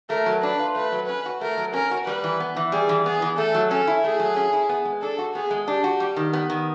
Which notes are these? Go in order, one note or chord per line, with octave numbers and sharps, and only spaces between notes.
A3 A#4
F#3
D4 B4
F4
A3 B4
F#3
C#4 B4
F#4
A3 A#4
F#3
C#4 A#4
F#4
G3 B4
E3
B3
E3
G3 G#4
E3
B3 G#4
E3
A3 A4
F#3
C#4 A4
E4
A3 G#4
F#3
C#4
E4
B3
G#3
D4 A4
F#4
B3 G#4
G#3
D4 G4
F#4
G3
D#3
B3
D#3